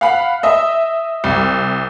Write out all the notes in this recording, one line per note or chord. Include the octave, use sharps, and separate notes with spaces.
F5 F#5 B5
D#5 E5
C2